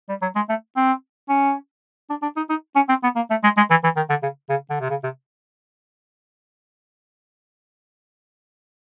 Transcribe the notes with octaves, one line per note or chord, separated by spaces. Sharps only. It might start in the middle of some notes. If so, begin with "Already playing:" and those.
G3
F#3
G#3
A3
C4
C#4
D4
D4
D#4
D#4
C#4
C4
B3
A#3
A3
G#3
G#3
E3
E3
D#3
D3
C#3
C#3
D3
C3
C#3
C3